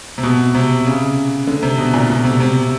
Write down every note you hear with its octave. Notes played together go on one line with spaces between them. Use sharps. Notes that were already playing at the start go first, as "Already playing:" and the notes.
C3
B2
C3
C#3
D3
C3
B2
A#2
B2
C3
C3